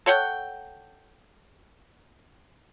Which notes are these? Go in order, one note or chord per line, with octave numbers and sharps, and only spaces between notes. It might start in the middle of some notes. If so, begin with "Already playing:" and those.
A4 C#5 F#5 G5